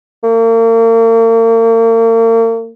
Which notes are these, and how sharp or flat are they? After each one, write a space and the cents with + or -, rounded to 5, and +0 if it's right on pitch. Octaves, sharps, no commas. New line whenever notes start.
A#3 -40